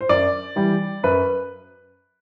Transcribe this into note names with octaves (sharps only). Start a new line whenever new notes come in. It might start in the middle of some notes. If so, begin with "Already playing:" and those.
C5
F#2 D5
E3 G3
F#2 B4